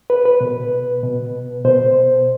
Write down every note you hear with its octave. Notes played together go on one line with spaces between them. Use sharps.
B4
B4
B2
B2
B2 C5